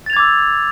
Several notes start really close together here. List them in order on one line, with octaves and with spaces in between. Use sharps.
A6 F7 G#6 D6 E6